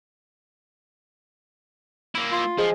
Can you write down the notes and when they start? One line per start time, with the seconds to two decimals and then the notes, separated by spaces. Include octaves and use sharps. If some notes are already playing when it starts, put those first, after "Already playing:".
2.15 A#3 E4
2.32 F4
2.58 F3 G#4 C5 D#5